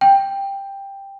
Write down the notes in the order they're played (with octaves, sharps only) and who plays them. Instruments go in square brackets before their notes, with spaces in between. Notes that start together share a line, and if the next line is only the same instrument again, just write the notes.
[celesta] G5